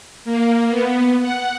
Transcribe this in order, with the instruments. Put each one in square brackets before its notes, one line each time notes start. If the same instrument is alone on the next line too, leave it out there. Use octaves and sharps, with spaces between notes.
[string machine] A#3
B3
F#5